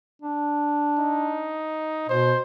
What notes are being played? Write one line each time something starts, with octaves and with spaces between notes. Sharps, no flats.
D4
D#4
B2 C5